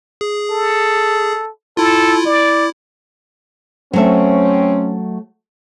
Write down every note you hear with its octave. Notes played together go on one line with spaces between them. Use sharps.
G#4
A4
E4 F4 A4
E4 D5
F#3 A3 C4 C#4 E5